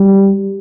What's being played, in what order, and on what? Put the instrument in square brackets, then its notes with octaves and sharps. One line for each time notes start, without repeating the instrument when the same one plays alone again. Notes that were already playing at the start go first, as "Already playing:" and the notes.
Already playing: [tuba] G3